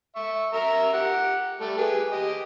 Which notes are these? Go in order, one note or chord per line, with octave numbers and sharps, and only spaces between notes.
E5 C#6
A#4 E5 A#5
G4 F#5
G3 A3 A4
G4 G#4 B4
G4 D#5